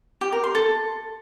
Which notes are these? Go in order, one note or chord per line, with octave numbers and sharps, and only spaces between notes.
G4
A#4
C6
A4